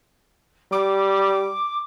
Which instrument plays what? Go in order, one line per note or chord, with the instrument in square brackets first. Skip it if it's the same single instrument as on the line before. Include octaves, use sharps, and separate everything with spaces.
[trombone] G3 [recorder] D6